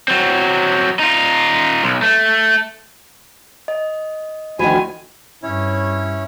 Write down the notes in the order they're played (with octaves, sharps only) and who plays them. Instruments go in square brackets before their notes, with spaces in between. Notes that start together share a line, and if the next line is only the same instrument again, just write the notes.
[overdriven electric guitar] F#3 C4
D#4 F4
B1
A3
[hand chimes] D#5
[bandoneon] D2 G#5 [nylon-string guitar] D#3 F3 [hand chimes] F#4 B5
[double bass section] G2 [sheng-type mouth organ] C#4 E4 C#5